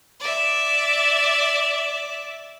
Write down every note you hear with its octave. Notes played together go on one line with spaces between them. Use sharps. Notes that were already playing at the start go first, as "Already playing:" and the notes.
D5 E5